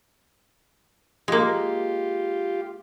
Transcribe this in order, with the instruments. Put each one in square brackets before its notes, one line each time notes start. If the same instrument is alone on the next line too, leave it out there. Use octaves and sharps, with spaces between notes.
[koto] G#3 A#3 [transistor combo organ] F4 G4